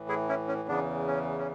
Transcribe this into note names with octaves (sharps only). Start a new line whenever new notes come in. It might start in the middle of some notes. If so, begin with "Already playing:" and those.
Already playing: A2 E3
E4 G#4
C#4 E4
C#4
E2 C#3 E3 B3 D4
C#4
C#4